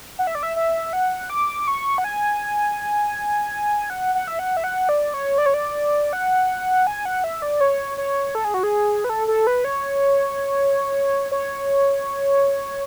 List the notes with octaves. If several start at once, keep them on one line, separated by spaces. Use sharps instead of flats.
F#5
E5
D5
E5
E5
F#5
D6
C#6
F#5
G#5
F#5
F#5
E5
F#5
E5
F#5
D5
C#5
D5
C#5
D5
F#5
G#5
F#5
E5
D5
C#5
C#5
A4
G#4
F#4
G#4
B4
A4
A4
B4
C#5
C#5